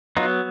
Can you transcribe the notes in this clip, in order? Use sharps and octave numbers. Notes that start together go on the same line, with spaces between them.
F#3 B3 D#4 F4